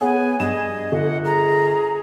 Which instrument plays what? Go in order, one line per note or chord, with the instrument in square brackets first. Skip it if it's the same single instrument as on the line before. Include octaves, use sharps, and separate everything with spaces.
[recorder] B3 [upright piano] G#4 C#5 F#5 [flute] G#5
[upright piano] G2 E7 [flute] G#4 [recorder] D#5
[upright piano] G1 [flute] F#5
[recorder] G#4 [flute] A#5